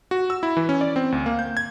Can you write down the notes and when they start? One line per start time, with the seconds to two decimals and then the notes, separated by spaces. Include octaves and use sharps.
0.11 F#4
0.30 E6
0.43 E4
0.57 E3
0.69 C#4
0.81 D5
0.96 C4
1.12 D2
1.26 A#3
1.39 G6
1.57 G#6